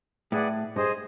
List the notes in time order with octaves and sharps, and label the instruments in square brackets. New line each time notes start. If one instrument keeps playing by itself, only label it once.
[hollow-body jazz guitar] A2 [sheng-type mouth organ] G#4 B4 D5 F#5
[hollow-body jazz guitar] G2 [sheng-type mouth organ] G#4 C5 D#5